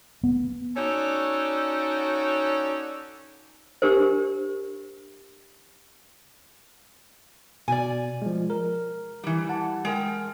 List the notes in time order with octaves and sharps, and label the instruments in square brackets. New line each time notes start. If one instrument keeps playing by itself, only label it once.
[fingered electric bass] B3
[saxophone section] C#4 D#4 F#4 A4 C#5 D5
[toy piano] D4 G4 A#4 C5
[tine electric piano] B2 [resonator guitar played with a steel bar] D5 G#5
[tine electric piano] F3 G#3
A#4
[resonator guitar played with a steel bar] E3 G3
[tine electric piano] F#5 A5
[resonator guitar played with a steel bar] G#3 A#4 G5